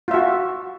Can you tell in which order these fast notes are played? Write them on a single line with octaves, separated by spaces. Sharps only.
F4 E5 F#4